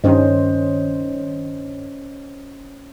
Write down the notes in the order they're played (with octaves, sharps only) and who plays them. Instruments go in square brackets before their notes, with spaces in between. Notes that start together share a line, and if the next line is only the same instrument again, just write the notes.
[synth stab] G2 D#3 [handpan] C#4 C5 D#5